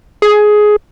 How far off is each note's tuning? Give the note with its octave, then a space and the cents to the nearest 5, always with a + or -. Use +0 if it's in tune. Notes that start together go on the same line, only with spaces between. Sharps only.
G#4 +15